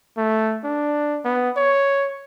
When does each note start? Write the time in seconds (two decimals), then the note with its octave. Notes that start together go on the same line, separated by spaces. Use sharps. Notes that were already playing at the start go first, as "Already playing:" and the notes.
0.18 A3
0.64 D4
1.25 B3
1.57 C#5